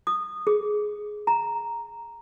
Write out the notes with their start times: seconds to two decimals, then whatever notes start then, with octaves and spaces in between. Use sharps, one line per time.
0.07 D#6
0.47 G#4
1.27 A#5